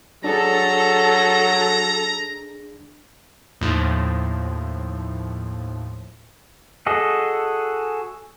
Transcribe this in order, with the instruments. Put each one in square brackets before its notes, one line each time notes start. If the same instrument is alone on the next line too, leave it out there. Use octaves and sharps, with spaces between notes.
[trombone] F#3 [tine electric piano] D4 G#4 [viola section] A4 [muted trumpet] A#5
[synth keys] D#2 A2 F3
[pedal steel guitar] F#4 G#4 A4 D#5